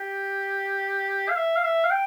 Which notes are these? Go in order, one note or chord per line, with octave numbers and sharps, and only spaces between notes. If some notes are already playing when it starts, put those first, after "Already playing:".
Already playing: G4
F5
E5
F5
E5
F5
G5